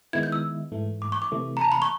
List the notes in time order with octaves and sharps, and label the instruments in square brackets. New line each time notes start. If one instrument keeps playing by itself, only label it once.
[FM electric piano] D#3 G#3 B3 E4 [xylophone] G#6
[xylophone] G6
E6
[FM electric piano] G#2 E3 A3
[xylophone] D6
C#6
D6
[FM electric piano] C3 E3 A3
[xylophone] A#5
A5
B5
C#6